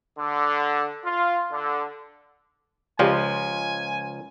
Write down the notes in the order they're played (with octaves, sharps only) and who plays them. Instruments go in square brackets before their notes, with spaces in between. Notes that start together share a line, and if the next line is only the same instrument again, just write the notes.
[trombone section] D3
F4
D3
[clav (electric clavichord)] C#2 F3 [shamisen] G#3 G4 D5 [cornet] G#5